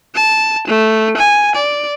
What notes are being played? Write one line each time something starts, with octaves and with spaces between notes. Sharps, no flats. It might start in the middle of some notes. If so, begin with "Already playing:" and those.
A5
A3
G#5
D5